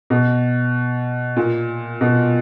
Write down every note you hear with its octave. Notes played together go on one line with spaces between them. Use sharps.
B2
A#2
B2